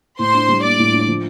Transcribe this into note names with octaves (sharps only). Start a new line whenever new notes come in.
A2 C5 C6
D4
G3
A#3 D5 D6
A2
D4
F3